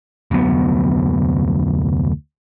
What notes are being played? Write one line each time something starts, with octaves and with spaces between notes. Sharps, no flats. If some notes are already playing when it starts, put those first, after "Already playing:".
F1 D2 F#3 B3